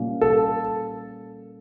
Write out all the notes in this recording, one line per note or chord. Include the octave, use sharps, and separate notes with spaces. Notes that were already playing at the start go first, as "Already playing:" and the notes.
Already playing: A#2 G3 A#3 C#4
A4